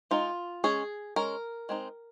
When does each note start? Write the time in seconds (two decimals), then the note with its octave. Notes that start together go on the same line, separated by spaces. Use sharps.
0.11 G#3 D#4 F4
0.64 G#3 C#4 G#4
1.16 G#3 C#4 A#4
1.69 G#3 C4 D#4